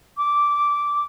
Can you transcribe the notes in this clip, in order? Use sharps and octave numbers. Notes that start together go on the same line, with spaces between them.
D6